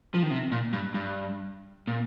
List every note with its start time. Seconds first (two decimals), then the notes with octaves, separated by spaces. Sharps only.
0.14 F3
0.23 D#3
0.31 C3
0.52 A#2
0.73 G2
0.94 G2
1.87 A#2